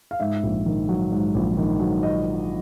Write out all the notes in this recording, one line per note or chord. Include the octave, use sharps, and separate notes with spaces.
F5
G#2 E5
A#1
D#3
F#3
G#2
A#1
D#3
F#3
D#5